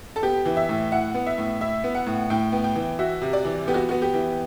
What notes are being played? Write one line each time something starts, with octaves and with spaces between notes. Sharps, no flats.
A4
B3 G4
E3
E5
A2
E4 F#5
B3
E5
A2
E4 E5
B3
F#5
A2
A2 G5
B3
G5
E3
F#4 E5
C3
D5
E3
B3 G4
F#4
B3 F#4
G4
E3